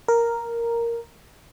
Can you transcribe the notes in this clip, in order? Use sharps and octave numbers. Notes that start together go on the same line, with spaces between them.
A#4